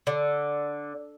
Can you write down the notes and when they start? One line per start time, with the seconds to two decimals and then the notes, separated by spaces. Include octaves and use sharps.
0.07 D3